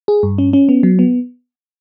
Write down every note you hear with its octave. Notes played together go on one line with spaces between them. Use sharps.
G#4
G2
C#4
C#4
B3
F#3
B3